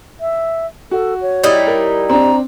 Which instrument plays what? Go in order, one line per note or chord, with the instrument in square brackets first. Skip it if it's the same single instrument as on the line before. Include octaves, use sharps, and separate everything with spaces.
[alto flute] E5
[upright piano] F#4 [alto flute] A4
[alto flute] C#5
[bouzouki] G3 D#4 E4
[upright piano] A#4
[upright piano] C4 D4 [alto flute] A#5